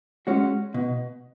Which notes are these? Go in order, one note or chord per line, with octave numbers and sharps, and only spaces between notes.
G#3 C#4 F#4 C#5
B2